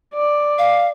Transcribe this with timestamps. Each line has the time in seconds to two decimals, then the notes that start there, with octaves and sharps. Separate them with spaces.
0.14 D5
0.58 F5